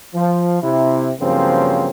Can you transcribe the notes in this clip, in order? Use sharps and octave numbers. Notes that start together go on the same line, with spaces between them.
F3
C3 E4
G2 C#3 F3 F#3 A#3 C4